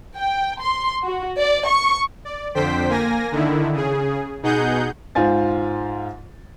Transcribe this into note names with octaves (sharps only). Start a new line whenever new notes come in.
G5
C6
F#4
D5
C#6
D5
F2 D3 C5 G5 B6
A#3 G#5 A#6
D3 D#3 E4
C#3 G#4
B2 D#4 G#4 F#5 G6
G#2 F4 C5 G#5 A6